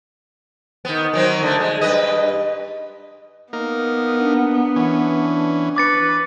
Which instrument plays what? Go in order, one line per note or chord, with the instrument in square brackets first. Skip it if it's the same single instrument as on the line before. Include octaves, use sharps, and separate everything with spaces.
[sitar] D#3 B3
D#3 F#3 C4
D3 A3
G#3
G2 B4 D#5
[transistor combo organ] A#3 D#4 A#4 [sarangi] B3
[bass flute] D4
[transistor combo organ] E3 C#4
[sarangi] B4 [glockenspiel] D6 A6 C#7